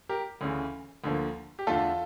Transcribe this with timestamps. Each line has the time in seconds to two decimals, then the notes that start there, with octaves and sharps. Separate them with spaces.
0.09 G4 A#4
0.41 D2 C#3 E3
1.04 D2 D3 F3 A#3
1.59 G4
1.67 E2 D3 A3 F4 A4